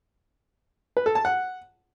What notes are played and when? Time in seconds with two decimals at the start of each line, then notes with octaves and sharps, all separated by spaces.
0.97 B4
1.06 A4
1.15 A5
1.25 F#5